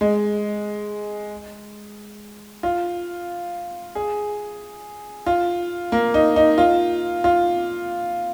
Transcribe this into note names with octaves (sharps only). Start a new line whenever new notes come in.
G#3
F4
G#4
F4
A#3
D#4
D#4
F4
F4